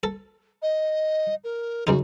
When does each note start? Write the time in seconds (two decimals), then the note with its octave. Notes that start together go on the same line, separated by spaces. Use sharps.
0.03 A4
0.62 D#5
1.44 A#4
1.87 F#2 C#3 D#4 F#4